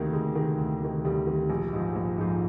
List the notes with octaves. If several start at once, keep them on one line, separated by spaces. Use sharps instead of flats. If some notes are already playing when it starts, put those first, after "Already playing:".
Already playing: D2 C3 D#3 A#3
D2 G#3
C3 D#3
D2
C3 D#3
D2 G3
C3 D#3
A#1
G#2 F3
A#1
G#2 F3